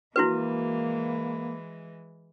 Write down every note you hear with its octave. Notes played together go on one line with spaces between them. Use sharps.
E3 G#3 A#3 E4 F#4 B4